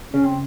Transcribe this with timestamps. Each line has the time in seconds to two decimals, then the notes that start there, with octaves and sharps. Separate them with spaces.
0.13 C#3 C#4
0.25 C4